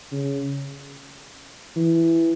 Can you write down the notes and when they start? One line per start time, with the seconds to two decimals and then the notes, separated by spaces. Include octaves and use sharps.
0.12 C#3
1.76 E3